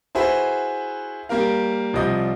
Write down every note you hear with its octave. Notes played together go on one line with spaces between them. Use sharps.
E4 F#4 G#4 B4 C5 E5
G3 A#3 G4 A#4 F5
C2 F3 G3 D#5 D#6 G6